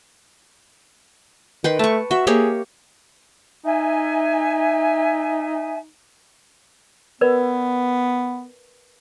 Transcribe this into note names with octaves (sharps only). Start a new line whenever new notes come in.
D#3 B4 G5 C6
A3 A5 C#6
F#4 E5
A#3 G4 G#4 C#5
D#4 E5 G#5
B3 A#4 B4 D5